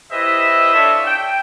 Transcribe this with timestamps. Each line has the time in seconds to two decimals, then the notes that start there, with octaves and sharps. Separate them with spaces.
0.11 E4 G4 B4 C5 D#5 E5
0.74 D4 F4 A4 C#5 E5
1.06 G5